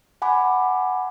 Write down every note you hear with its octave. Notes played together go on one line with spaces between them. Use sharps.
F#5 G#5 B5 D6